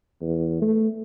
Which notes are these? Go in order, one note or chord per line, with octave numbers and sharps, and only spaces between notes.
E2
A3